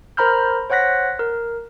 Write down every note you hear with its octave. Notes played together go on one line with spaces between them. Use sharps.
A#4 C5 A#5 B5 F6 G6
C5 C#5 F#5 F#6 A#6 B6
A#4